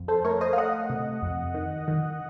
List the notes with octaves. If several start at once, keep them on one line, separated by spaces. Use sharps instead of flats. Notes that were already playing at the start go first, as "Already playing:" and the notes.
Already playing: F2
A4 C5
A3 A#4 C#5
C5 D#5
F5
A3 D#5 F#5
C3
F2
D#3
D#3